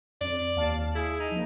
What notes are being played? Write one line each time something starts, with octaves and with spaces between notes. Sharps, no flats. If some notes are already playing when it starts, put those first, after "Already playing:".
F2 D5
D#2 F5 A5
E4 G#4
D#4
F3 A#3